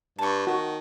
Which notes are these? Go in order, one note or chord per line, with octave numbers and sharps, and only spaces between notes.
G2 A5 C#6
D#3 F#4